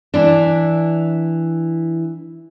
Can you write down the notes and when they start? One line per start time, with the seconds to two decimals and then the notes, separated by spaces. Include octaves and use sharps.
0.14 E3 D4